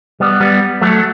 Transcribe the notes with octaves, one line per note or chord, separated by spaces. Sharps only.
G3 B3
G3 B3
F#3 A3